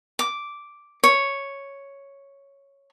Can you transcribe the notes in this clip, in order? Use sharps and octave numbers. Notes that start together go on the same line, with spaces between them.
D6
C#5